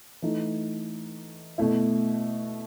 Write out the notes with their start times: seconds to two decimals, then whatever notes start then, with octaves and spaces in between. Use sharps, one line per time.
0.22 E3 A3 D#4
1.58 B2 A3 E4